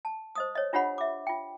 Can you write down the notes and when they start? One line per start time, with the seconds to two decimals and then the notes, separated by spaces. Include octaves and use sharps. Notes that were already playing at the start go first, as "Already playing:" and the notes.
0.05 A5
0.35 C5 D#5 D#6
0.55 C#5 D#5
0.73 D4 F4 G4 C#5 F#5 B5
0.98 E5 D6
1.27 F4 G5